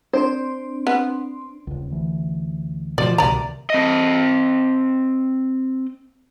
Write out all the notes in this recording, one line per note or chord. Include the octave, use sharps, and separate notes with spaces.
C4 D4 C5 C6
B3
D#1 C#2
D2 E3
B2 D#3 F3 D5
C2 B2 D#3 D5 A#5
C4 D#5